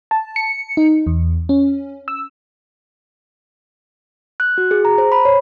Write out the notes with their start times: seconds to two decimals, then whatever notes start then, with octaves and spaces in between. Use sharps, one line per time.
0.11 A5
0.36 C#7
0.77 D#4
1.07 E2
1.49 C#4
2.08 E6
4.40 F#6
4.58 F#4
4.71 G#4
4.85 A#5
4.98 C5
5.12 B5
5.25 C#5